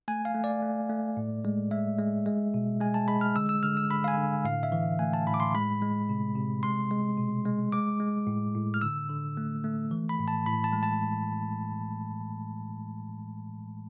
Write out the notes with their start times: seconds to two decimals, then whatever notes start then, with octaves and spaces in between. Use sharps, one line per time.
0.08 A3 G#5
0.25 F5
0.34 A3
0.44 D5
0.62 A3
0.90 A3
1.17 A2
1.45 G#3
1.71 G#3 E5
1.98 G#3
2.26 G#3
2.54 B2
2.80 G#3 G#5
2.94 A5
3.08 G#3 B5
3.21 F6
3.36 D3 E6
3.49 E6
3.63 D3 F6
3.77 E6
3.90 D3 B5
4.04 F5
4.08 G#5
4.17 D3
4.45 A2 F5
4.63 E5
4.72 E3
4.99 A3 G#5
5.13 A5
5.26 A2 B5
5.34 D6
5.40 C6
5.54 G#3 B5
5.82 G#3
6.09 C3
6.36 C3
6.63 G#3 C6
6.91 G#3
7.18 B2
7.45 G#3
7.73 G#3 D6
8.00 G#3
8.27 A2
8.55 A2
8.74 F6
8.81 D3 E6
9.09 D3
9.37 A3
9.64 A3
9.91 E3
10.09 B5
10.19 A2
10.28 A5
10.46 A2 B5
10.64 A5
10.73 G#3
10.83 A5